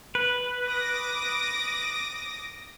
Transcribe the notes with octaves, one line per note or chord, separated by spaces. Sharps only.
B4
D6 D#6 A#6